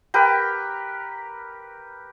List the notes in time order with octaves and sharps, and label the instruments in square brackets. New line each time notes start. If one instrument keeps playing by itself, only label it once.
[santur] G4 A#4 B4